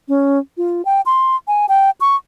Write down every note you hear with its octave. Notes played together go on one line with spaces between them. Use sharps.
C#4
F4
G5
C6
G#5
G5
C#6